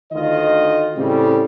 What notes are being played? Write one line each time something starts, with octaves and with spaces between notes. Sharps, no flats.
D2 D#3 F4 D#5
A2 C#3 G3 C4